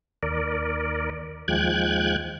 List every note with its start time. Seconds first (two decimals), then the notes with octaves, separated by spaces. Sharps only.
0.23 D#2 A#4 D5
1.48 D#2 F3 G#3 G5 F#6 G#6